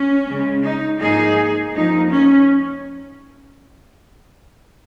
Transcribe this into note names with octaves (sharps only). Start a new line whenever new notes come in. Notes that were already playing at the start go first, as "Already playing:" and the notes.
Already playing: C#4
C#3 G#3
D#4
G#2 F3 A#3 D#4 G#4
F2 F3 A#3 D#4
C#4